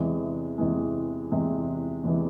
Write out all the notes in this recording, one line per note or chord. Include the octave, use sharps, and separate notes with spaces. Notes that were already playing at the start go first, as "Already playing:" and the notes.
Already playing: E2 C3 E3 G#3
E2 C3 E3 G#3
E2 C3 E3 G#3
E2 C3 E3 G#3